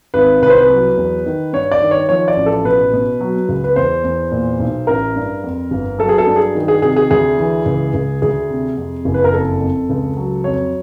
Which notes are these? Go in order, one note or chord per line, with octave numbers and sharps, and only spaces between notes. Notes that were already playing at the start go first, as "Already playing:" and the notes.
G#1 B4
C2 B4
C5
B4
F#3
E2
D#3
G2 C#5
D5
D#3
C#5
F3 C#5
D5
A1
A4
B2 B4
B2
F#3
C#2
B4
E2 C5
E2
A#2
B1
A1 A#4
G2
F2
G1
F#3 A4
G#4
A4
G2
G#4
D#3
G#4
C3 G#4
G#4
D2 G#4
E3
C#2
C#2
D2 G#4
C3
F2
F#1
B4
A#4
F2 A4
F2
C#2
F#3
F2 C#5